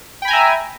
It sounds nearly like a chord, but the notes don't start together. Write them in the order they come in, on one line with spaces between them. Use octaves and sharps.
G5 B5 G#5 A#5 E5